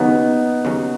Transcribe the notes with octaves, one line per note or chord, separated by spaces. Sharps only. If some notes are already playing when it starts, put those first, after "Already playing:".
Already playing: D#2 C#3 F#3 B3 C#4 D#4
D#2 C#3 F#3 C#4